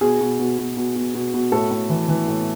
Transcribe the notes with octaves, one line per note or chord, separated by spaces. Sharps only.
B2 G#4
B2
B2
B2
B2
B2
B2
B2
A2 A4
A2
E3
E3
A2